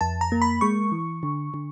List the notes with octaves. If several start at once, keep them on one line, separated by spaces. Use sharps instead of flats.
F2 A5
A#5
A#3
B5
G#3 C#6
E3
D3
D3